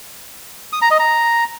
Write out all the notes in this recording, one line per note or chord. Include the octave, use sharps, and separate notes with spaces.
D#6
A#5
D#5
A#5